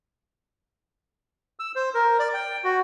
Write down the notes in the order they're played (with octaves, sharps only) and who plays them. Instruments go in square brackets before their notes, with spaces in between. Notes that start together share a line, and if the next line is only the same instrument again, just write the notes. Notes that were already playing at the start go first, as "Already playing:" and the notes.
[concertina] E6
C5
A#4
D5
G5
F#4